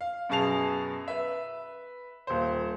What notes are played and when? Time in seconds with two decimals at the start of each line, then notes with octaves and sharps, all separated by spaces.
0.01 F5
0.29 F#2 B2 G#4 A5 C7 F7
1.08 B4 E5
2.27 D#1 C5